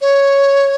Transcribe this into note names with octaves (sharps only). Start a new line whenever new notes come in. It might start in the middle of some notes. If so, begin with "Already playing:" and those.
C#5